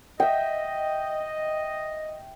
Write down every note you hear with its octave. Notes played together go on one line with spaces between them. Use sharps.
D#5 E5 G5